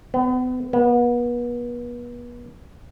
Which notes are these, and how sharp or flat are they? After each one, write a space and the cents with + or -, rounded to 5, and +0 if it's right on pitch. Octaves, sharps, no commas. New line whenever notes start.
B3 +40
B3 -35